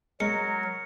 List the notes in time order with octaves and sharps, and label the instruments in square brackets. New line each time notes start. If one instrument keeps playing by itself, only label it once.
[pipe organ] F#3 A#4 [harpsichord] G#3 [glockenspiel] C#7